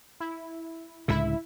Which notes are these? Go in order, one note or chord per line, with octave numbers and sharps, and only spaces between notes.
E4
C#2 A2 D3 E4 E5